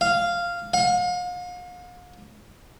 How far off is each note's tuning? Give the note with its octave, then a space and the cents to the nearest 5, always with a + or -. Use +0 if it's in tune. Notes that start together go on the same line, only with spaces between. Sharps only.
F5 -10
F5 +40